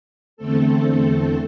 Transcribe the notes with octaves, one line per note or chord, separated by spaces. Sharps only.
E2 D3 A3 C4 A4